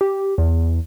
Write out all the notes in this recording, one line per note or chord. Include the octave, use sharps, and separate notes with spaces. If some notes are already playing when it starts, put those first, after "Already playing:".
G4
E2